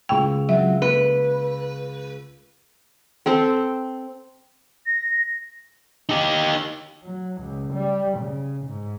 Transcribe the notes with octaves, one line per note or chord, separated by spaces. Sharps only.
C#2 G5 C#6 E6
F#3 C4 F4 E5
A#3 B4
C4 A4 C5
A#6
D#4 G4
F#3
C#2
G3
C#3
G#2